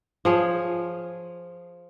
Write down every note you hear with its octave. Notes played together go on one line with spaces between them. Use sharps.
F3 G#4 C#5